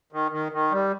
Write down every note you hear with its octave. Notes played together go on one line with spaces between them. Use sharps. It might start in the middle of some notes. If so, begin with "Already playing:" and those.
D#3
D#3
D#3
G3